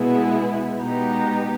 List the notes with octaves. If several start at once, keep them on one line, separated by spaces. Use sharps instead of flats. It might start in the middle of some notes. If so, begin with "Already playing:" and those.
Already playing: B2 G#3 B3 E4
B2 G#3 B3 D#4 G4